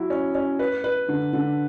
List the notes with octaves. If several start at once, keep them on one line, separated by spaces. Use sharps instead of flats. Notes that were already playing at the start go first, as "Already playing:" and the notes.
Already playing: F#3 E4
C#4
C#4
B4
B4
D3
D3